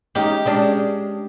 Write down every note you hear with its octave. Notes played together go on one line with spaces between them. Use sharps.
G#3 C#4 D#4 G4
G#3 C#4 D4